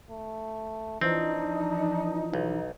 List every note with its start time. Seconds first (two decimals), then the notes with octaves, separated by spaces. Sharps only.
0.10 A3
1.01 E3 F3 C4 D4 D#4
2.33 B1